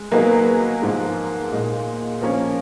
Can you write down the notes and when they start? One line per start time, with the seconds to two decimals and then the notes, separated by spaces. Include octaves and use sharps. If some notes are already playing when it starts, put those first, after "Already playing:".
Already playing: G#3
0.11 F#3 A#3 B3 D#4 G#4 B4
0.82 G#2 F3 G#3
1.52 A#2 G#3 D#4
2.21 F3 A#3 C#4